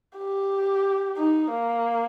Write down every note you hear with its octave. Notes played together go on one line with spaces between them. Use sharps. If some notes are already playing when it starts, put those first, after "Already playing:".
G4
D#4
A#3